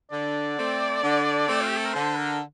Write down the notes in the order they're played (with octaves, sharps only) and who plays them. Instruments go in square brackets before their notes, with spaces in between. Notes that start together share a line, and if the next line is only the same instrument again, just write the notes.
[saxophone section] D3 [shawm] D5
[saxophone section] A3 C4
D3
A3 C4
[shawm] F4
G4
A4
A#4
[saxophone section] D3 [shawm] C5
[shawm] A#4